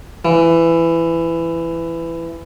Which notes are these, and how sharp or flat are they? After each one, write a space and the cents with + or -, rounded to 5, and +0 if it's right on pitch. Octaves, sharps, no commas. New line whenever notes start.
E3 +15